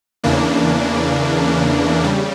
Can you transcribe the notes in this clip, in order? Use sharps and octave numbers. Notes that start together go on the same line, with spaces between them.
E2 C#3 E3 A#3 D4
C#3 G3